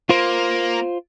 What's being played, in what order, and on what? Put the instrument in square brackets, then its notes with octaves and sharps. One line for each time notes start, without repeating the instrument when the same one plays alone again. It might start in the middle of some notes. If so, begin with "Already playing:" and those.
[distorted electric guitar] A#3 [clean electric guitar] F4 C5